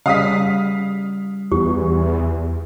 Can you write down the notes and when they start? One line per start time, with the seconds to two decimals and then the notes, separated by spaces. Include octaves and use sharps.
0.06 C#3 G3 F5 D#6 B6
1.52 E2 G4